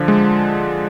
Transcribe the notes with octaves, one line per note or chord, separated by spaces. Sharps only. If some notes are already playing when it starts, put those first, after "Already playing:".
Already playing: D3 F3
G#3